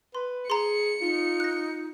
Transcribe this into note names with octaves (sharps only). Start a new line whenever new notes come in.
B4 C6
G#4 A#5 C6 C#7
D#4 F4
F#6 A#6